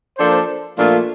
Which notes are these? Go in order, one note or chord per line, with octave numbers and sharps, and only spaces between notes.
F3 A#3 D4 A4 C5
A#2 F3 A3 D4 F4